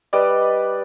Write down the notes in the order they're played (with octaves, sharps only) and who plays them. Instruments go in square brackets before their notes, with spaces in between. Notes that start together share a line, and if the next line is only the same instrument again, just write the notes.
[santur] G3 B4 D5 D#5